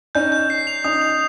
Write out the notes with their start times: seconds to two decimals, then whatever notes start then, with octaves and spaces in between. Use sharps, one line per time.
0.15 C#4 D#4 G6
0.32 G6
0.50 C7
0.67 F7
0.84 C#4 D#4 D#6
1.02 F7